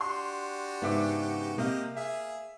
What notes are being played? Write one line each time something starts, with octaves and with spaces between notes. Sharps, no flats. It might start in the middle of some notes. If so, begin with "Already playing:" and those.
D4 F#4 G4 C6
G#2 C#3 B3 E5 D6
C3 A#3 G4 D#5 F5
G#4 E5